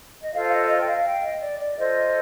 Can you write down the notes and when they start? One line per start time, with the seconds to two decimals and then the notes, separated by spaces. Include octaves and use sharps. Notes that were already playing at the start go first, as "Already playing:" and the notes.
0.21 D#5
0.33 F4 A4 C5 F5
0.51 D#5
0.69 D#5
0.80 G5
0.86 F5
1.04 G5
1.22 D#5
1.40 D5
1.58 D5
1.75 F4 A4 C5 D#5